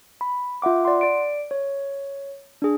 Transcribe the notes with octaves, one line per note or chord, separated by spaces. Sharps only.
B5
F4 E5 F#5 D6
D5 F#5 C6
D5 D7
C#5
D4 G#4